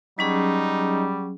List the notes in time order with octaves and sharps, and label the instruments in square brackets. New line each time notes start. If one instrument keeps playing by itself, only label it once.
[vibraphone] F#3 C#4 G#4 [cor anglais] G3 [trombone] D#4